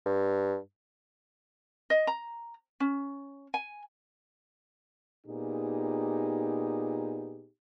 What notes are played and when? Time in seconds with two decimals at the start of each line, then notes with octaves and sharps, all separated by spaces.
0.06 G2
1.90 D#5
2.07 A#5
2.80 C#4
3.54 G#5
5.27 A#2 B3 D#4 G4 G#4